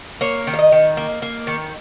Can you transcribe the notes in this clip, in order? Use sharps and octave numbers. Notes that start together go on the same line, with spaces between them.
A#3 C#5
D#3
F5
D#5
D#3
A#3
A#3
D#3